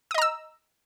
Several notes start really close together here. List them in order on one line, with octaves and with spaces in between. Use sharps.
D#6 D#5 A#5 E6